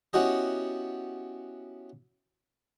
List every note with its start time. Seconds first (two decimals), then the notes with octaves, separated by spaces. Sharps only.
0.13 B3 C#4 E4 F#4 G4 D#5